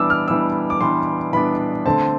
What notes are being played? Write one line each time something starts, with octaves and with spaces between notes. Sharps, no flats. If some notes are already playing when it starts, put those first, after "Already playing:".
Already playing: E3 G3 B3 D4 D6 E6
F6
E3 G3 B3 D4 E6
D6
E3 G3 B3 D4 C6
E3 G3 B3 D4 B5
D3 A3 C4 A5